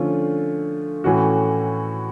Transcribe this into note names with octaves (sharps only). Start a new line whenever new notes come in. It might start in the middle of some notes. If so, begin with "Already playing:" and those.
Already playing: D3 F3 A3 C#4 F4
A2 E3 A3 C#4 F#4